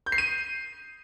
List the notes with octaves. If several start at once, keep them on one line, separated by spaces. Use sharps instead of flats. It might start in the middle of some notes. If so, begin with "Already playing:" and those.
G6
C7
D#7